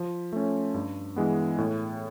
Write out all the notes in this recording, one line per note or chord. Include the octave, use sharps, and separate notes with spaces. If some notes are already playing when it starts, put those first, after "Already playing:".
Already playing: F3
A3 C#4
G2
E3 G#3 B3
A2